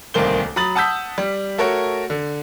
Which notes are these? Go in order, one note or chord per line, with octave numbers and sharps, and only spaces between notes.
D1 C2 D#3 A#3 C5 G7
F#3 A#5 B5 D#6 A6 F#7
F#5 A5 D#6 E6 G6 B6
G3
A3 F#4 A#4 C#5
D3